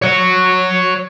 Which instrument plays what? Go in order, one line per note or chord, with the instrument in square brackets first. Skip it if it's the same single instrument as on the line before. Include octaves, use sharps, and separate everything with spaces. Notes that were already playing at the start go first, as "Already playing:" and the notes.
[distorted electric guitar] C#5 F#5